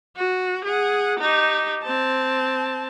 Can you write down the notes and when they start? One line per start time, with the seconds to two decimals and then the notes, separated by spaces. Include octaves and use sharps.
0.16 F#4
0.65 G#4 F#5
1.20 D#4 G4
1.84 C4 A5